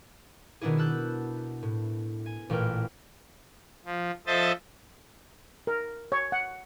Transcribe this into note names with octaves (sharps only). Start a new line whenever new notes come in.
B2 D#3 B3 D4 E4 G#4
A5 E6 F#6 G6
A2
G#5
A1 A#2 A3 B4 G5 F6
F3
F3 A4 C5 D#5 E5 A6
A#4
C#5
F#5